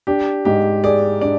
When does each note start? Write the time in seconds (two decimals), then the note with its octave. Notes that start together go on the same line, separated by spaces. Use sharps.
0.07 D4 G4
0.45 G#2 G4
0.84 G#4 D5
1.21 D4 D5